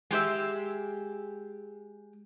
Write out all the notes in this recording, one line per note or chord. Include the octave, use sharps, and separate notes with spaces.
G#3 G4 E5